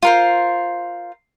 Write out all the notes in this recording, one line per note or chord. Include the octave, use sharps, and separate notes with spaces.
F4 A#4 C5